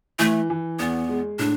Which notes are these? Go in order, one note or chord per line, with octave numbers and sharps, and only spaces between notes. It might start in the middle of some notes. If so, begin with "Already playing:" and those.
E3 A3
E3
E2 B3
G#3
A2 D4